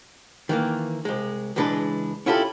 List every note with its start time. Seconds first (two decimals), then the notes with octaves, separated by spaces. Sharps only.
0.49 D#3 E3 A#3
1.05 C2 G#3
1.56 C#2 E3 G#3 D4 B4
2.26 C#4 E4 F4 G4 A4